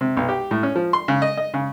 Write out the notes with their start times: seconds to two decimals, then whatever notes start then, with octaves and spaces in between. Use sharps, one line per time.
0.01 C3
0.17 B1
0.29 G4
0.51 A2
0.63 C#4
0.76 F3
0.93 C6
1.08 C#3
1.22 D#5
1.37 D#5
1.54 C#3